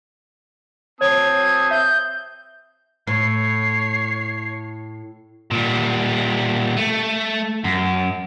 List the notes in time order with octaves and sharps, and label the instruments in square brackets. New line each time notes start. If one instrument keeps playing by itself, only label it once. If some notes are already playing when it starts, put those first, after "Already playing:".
[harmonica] C4 A5 D#6 [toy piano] C#5 [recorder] G#6
[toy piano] E5 [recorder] G6
[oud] A2 [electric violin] C#5 C7
[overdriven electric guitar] A#2 G3
A3
F#2